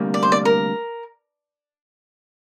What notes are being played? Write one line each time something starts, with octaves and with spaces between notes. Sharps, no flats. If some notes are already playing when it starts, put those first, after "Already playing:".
Already playing: D2 C3 G3 A#3
D5
C5
D5
A#4